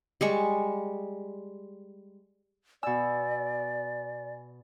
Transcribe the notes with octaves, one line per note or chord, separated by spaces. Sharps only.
G3 G#3 C#6
B2 D5 G#5 E6